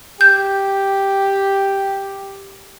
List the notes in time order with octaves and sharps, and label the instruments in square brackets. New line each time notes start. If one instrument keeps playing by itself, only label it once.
[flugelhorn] G4 [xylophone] G6